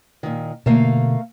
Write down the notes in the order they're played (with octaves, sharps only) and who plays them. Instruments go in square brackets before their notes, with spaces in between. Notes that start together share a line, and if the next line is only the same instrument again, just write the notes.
[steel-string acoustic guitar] A#2 D#3
[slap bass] B2 D3 [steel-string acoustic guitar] A3 A#3 F5